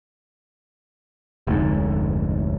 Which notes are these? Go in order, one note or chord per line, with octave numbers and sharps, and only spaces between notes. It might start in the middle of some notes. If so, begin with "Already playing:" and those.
F1 D2 G#2